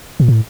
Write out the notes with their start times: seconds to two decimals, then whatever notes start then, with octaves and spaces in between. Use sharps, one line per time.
0.20 A#2
0.28 A2